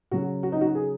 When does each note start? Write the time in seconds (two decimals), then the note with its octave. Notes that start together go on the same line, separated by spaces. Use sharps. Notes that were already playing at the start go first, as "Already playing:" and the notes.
0.11 C#3 F#3 F#4
0.43 F#4
0.52 D#4
0.61 F#4
0.75 G#4